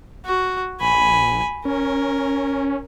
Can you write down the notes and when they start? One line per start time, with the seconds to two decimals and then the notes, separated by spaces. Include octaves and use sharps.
0.25 F#4
0.81 A#1 G#5 B5
1.65 C#4 A#4